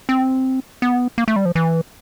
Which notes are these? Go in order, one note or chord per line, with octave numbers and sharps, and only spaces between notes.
C4
B3
A#3
A3
G3
F3
E3